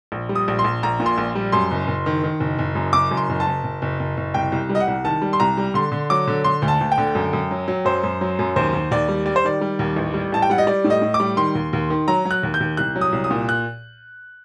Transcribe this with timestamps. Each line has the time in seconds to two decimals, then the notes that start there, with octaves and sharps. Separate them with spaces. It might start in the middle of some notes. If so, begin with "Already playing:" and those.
0.12 A#1
0.29 G3
0.35 D#6
0.48 A#1
0.59 C6
0.64 A#1
0.83 A#1 A#5
1.00 A#2
1.06 C6
1.18 A#1
1.35 G3
1.52 F#2 C6
1.71 F#1
1.87 F#1
2.06 D#3
2.24 D#3
2.40 F#1
2.59 F#1
2.75 F#2
2.93 F#1 D6
3.11 F#2
3.17 C6
3.29 F#1
3.40 A5
3.47 F#1
3.64 F#1
3.82 F#1
3.99 F#1
4.17 F#1
4.34 C2 G5
4.52 C2
4.69 G3
4.75 D#5
4.80 F#5
4.87 C2
5.04 D#3 A5
5.22 G3
5.33 C6
5.40 C2 A#5
5.57 G3
5.74 D3 C6
5.92 D3
6.10 F#3 D6
6.28 D3
6.44 D3 C6
6.62 D2
6.68 A5
6.81 D2
6.92 G5
6.98 D3
7.15 F#2
7.33 F#2
7.51 F#3
7.68 F#3
7.85 F#2 C5
8.04 F#2
8.21 F#3
8.39 F#2
8.56 D#2 C5
8.73 D#2
8.91 D#2 D5
9.09 G3
9.26 G3 D5
9.36 C5
9.44 D#3 D5
9.61 G3
9.79 D#2
9.96 A1
10.14 G3
10.32 A1 A5
10.42 G5
10.50 G3 F#5
10.58 D#5
10.67 G3 D5
10.84 A2
10.90 D#5
11.02 A2
11.14 D6
11.20 G3
11.37 D#3 C6
11.55 D#2
11.73 D#2
11.90 D#3
12.08 F#3 A#5
12.25 F#3
12.31 F#6
12.43 D#2
12.54 G6
12.60 D#2
12.77 C2 F#6
12.96 F#3
13.01 D#6
13.12 C2
13.24 D#6
13.31 A#2
13.49 F#6